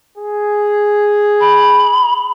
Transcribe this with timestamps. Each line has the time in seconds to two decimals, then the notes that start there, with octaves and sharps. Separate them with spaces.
0.18 G#4
1.41 B5